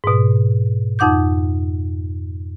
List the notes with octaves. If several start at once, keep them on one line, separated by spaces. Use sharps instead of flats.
G#2 B2
F2 D#4 F#5 D6 G6